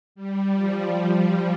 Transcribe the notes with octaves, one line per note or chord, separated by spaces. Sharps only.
G3
F3